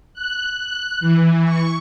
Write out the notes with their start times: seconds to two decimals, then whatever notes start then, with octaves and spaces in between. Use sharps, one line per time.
0.14 F#6
0.57 F#6
1.00 E3
1.44 C#6